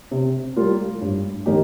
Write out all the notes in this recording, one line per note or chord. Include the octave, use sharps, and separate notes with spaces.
C3
G3 A#3 F4
G2
D#3 A#3 D#4 G4